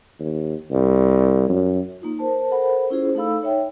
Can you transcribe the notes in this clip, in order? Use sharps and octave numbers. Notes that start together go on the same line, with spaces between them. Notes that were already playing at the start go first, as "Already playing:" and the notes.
D#2
C2
F#2
A#3 D#4 F4
A#4 C5 A5
A4 A#4 C5 F#5 B5
C#4 E4 F4 G#4 C5
A3 D#4 A4 F5 B5 E6
D#4 C#5 E5 G5